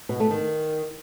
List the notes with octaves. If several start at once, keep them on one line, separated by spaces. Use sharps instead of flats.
B2
A3
D#3